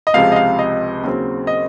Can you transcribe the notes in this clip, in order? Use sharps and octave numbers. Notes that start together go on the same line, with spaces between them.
D#5
C#2 C3 F3 G#3 F5
D#5
F5
D#5
D#2 C#3 F#3 C4
D#5